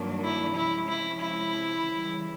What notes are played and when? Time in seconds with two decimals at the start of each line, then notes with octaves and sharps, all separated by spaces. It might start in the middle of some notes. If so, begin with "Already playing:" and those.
Already playing: G2 D#3 F#3 A#3 D4
0.24 E4
0.55 C3 F3 G#3 C#4 E4
0.88 E4
1.20 E4
1.85 C#3 E3 G3